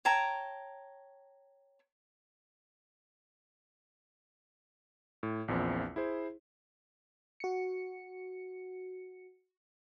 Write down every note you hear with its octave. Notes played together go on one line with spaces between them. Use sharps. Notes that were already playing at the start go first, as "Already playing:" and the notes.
C#5 G5 A5 A#5
A2
A#1 E2 A#2 C4 E4
E4 G#4 C5
F#4 C#7